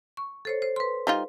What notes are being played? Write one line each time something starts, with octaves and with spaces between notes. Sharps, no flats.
C#6
A4 C5 C#5
C5
B4 C6
G3 D#4 F4